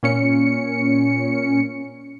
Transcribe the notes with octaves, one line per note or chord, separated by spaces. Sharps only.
A#2 C#4 C#7